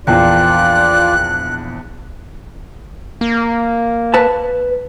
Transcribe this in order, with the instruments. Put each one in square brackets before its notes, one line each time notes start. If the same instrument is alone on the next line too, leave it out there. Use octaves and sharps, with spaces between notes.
[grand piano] A#1 E2 [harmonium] F4 D5 [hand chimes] A#4 G5 [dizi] F#6
[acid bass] A#3
[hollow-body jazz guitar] B4 A5